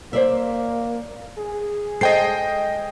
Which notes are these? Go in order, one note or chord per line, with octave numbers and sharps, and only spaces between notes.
A#3 C5 D5 E5
G#4
G#3 A4 C5 D#5 G5 C7